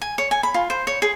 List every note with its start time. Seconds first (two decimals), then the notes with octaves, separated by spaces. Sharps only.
0.01 G#5
0.18 C#5
0.31 G#5
0.43 B5
0.54 F4
0.70 C5
0.87 C#5
1.02 G#4